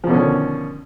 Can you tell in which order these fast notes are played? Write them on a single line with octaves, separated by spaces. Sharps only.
F3 B2 D3 C#4 D#3